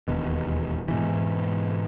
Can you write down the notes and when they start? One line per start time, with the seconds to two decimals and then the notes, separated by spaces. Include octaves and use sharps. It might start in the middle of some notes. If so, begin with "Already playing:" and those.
0.08 E1 D#2 B2
0.88 G#2 B2 E3